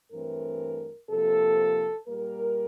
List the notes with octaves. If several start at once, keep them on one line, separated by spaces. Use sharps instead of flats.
G2 E3 A3 C4 A#4
C3 F3 A#3 A4
A#2 G3 A#3 A#4